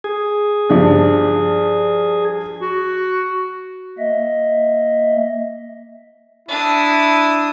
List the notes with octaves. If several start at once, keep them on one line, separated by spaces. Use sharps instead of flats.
G#4
G2 F3 D4
F#4
A#3 D#5 E5
D4 E4 D#6